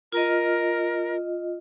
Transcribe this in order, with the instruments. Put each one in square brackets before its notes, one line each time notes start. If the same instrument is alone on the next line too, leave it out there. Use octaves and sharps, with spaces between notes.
[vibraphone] F4 D#5 [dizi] A#4